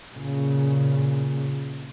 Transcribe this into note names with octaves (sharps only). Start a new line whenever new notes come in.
A#2 C#3